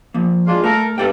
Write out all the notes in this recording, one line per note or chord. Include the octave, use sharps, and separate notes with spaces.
F3 A#3
G#3 D4 F4
A3 A4 A#4
G2 A4 D5 G5